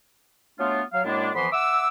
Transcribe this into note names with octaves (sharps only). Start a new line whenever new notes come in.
F#3 A3 B3 D4 F4
F#3 F5
F#2 A2 G#3 A#3 D4
F2 E3 F3 B3 B5 C6
E5 F#5 D6 E6